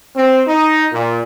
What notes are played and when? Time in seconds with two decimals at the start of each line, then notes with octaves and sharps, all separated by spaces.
0.16 C4
0.47 D#4
0.93 A#2